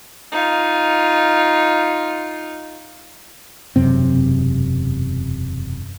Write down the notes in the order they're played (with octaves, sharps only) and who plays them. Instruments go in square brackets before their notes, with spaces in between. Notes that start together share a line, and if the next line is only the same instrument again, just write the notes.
[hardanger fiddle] D#4 F4
[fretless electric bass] E1 F#2 C3 C4